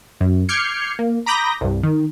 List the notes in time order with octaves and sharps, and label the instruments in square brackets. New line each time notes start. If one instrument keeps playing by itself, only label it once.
[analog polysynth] F#2
D6 F6 G6 G#6 C7 C#7
A#3
A#5 B5 D6 D#6 G6 A#6
C2 G2
D#3